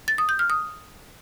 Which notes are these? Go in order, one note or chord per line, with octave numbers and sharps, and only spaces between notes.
A6
D#6
G6
F6
D#6